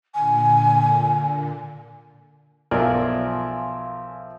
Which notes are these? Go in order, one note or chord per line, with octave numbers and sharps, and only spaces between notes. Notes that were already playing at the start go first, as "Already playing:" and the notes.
A#2 D3 G#5
B1 F3 A#4 D5 E5 F5 G#5 E6